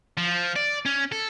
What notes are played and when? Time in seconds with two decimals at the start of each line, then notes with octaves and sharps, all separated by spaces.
0.17 F3
0.56 D5
0.86 C#4
1.12 A4